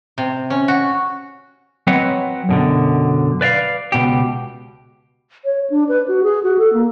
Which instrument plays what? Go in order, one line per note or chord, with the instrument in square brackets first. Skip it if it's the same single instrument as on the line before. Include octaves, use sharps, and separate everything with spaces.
[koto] C3
C#4
F#4
[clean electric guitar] F#3 C4 B4 C#5 D#5 F#5
F#2 B2 D3
B4 D5 E5 F5
C#2 B2 G4
[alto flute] C#5
D4
B4
F#4
G#4
F#4
A4
A#3